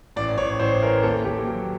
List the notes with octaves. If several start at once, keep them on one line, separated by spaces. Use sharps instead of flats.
A1 D5
A1 C#5
A1 C5
E3 A#4
D#2 A4
D#2 G4
F#3